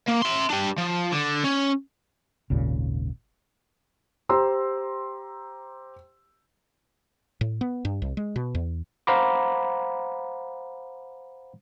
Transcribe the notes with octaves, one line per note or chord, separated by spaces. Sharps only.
A#3
E5 C6
D4 G4
F3
D3
C#4
G#1 D#2 A#2 C#3
G4 C5 A#5 C6 E6
A2
B3
G2
C2
G#3
B2
E2
C5 F5 F#5 A#5 B5 D6